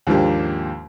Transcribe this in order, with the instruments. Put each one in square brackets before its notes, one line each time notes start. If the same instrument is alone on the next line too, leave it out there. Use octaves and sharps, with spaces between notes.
[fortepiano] D#2 G#2 F3 A#3 D4 G4